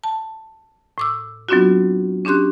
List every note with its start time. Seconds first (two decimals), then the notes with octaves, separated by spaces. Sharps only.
0.04 A5
0.98 A2 D6 E6
1.49 F#3 B3 C4 D4 F4 F#4
2.25 C#4 D4 G4 C6 F#6